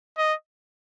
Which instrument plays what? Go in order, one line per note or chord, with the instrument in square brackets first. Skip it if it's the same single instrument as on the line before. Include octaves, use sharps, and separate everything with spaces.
[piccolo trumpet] D#5